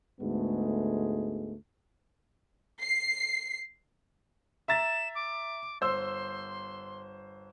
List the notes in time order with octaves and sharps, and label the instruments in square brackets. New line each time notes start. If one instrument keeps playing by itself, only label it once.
[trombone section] D2 G#2 G#3 A3 B3
[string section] C7
[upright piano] E5 A#5 A6 [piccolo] E7
[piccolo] D6
[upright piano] G1 C5 E6 [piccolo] C6